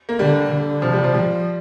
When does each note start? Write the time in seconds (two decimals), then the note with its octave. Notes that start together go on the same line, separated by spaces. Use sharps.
0.09 A#3
0.19 D3 G3
0.51 D3
0.82 C3 F3
0.93 G3
1.04 F3
1.14 F3 G3